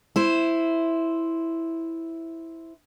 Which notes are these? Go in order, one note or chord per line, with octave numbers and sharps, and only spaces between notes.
E4 C5